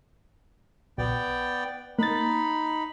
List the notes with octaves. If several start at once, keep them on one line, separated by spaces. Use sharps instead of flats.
A#1 B3 D5 G5
A#3 D#4 B5 A6